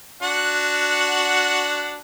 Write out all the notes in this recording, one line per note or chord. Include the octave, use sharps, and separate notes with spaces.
D4 F#4 F#5